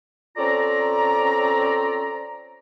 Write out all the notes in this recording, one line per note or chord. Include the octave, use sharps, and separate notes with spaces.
C4 C#4 F4 A4 D5 A#5